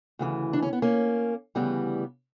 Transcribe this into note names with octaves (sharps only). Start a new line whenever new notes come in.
D2 C#3 E3
D4
C#4
B3
A#3 C#4
D2 C#3 E3 G3 B3